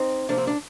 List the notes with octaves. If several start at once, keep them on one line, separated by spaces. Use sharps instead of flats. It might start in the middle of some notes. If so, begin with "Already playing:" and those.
Already playing: C4 D#4
C3 F3 A#3 D4
C4
D4